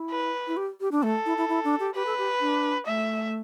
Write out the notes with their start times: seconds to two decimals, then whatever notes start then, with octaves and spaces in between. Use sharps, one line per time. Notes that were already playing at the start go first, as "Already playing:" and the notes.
Already playing: E4
0.11 B4
0.47 E4
0.57 G4
0.81 G4
0.92 D4
1.03 A3 A4
1.26 E4
1.37 E4
1.49 E4
1.64 D4
1.80 G4
1.95 G4 B4
2.06 A4
2.18 G4
2.41 D4
2.87 A3 E5